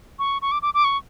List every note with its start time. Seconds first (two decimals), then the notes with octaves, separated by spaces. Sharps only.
0.19 C#6
0.42 C#6
0.52 D6
0.62 D6
0.74 D6
0.84 C#6